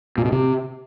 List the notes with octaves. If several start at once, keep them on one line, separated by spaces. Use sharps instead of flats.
A#2
B2
C3